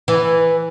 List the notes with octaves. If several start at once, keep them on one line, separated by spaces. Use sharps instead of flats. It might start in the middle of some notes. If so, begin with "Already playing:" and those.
E3